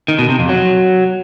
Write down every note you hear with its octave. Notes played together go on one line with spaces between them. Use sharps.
D#3
B2
C3
F2
F#3